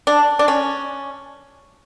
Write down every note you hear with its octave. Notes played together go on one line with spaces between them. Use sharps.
D4
D4
C#4